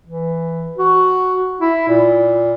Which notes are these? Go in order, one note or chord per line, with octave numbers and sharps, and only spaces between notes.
E3
F#4
E4
A#2